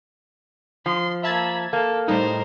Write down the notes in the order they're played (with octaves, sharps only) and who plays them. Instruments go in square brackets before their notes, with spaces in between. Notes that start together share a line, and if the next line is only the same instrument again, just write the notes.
[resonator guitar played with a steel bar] F3 [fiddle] C6
[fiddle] A#3 B5 [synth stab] E5 A5 G#6
[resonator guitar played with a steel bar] A#3 [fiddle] A4
[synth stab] A2 G3 D#4 [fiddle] A#4 C5